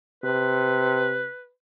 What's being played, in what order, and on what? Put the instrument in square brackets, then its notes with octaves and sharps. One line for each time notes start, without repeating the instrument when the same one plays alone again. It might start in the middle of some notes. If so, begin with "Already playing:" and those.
[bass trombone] C3 [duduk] B4